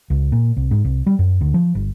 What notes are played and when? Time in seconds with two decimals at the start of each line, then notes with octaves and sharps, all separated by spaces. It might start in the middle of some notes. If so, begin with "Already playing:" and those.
0.10 C#2
0.32 A#2
0.57 C2
0.71 G#2
0.84 C2
1.06 G3
1.19 F#2
1.41 D2
1.54 F3
1.75 G1